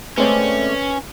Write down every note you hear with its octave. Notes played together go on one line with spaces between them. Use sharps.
G#3 A3 C4 C#4 B4 C#5 D5